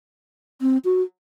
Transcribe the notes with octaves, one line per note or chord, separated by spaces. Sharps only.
C4
F#4